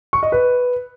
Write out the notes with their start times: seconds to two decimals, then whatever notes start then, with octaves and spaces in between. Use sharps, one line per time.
0.13 C#6
0.23 D#5
0.32 B4